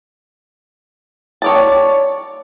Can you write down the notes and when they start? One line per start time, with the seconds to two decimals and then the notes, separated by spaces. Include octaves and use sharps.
1.42 C#5 D5 A5